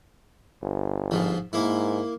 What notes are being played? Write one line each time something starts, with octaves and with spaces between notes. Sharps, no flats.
G1
G#2 F3
G#2 A#3 E4